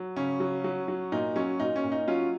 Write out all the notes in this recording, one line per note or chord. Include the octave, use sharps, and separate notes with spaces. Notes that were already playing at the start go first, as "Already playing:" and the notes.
Already playing: F#3
C#3 C#4
F#3
F#3
F#3
A#2 D#4
F#3 C#4
A#2 D#4
C#4
A#2
D#4
F#3 C#4 F4